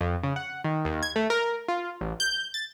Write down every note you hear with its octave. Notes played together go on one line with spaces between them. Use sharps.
F2
C#3
F#5
D#3
D#2
G#6
A3
A#4
F4
A1
G6
A6